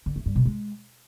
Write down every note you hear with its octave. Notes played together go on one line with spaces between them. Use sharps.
D3
A3
G2
B2
G#3